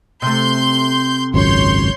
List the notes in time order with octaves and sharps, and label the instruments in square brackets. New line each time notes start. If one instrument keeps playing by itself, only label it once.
[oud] C3 A3 [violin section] C6 G6
[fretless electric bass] G#1 C#2 F#2 [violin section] C#5 C6 G6